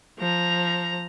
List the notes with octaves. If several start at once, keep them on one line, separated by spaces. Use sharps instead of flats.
F3 A#5